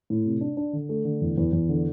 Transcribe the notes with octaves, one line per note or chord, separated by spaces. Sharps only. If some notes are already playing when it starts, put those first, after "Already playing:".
A2
C3
D4
D4
D3
A3
D3
E2
E2
E2
D3